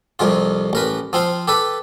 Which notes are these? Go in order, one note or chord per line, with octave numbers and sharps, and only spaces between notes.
C2 F2 C3 F4
A1 A#4 B4
F3 C4 F5 G5
G4 A4 B4